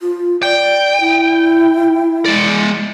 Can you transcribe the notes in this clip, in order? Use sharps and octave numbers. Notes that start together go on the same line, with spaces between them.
F4
D5 G5
E4
G#3 D5